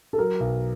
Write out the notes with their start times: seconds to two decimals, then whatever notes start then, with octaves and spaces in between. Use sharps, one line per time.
0.13 A4
0.18 F#3 A#4
0.40 B1